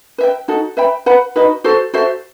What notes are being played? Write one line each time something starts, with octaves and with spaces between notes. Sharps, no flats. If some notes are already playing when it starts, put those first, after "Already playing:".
B4 E5 G5
D#4 F#4 A4
B4 E5 G5 B5
B4 F#5 B5
D#4 F#4 B4 D#5
F#4 A4 C5
F#4 A4 C5 E5